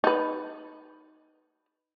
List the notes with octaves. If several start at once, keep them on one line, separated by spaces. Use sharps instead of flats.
D#4 B4